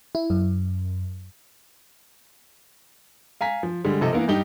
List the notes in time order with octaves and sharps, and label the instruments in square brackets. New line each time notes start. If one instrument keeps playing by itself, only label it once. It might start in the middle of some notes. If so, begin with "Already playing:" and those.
[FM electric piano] E4
F#2
[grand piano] F5 G#5 A#5 B6
F3
D3 G3 G#3
C3 F3 A4 D#5
E3 A#3 B3 A#4
G2 G3 D#4 G4 G7